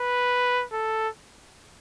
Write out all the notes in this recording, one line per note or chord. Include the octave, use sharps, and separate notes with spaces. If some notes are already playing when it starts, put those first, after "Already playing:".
Already playing: B4
A4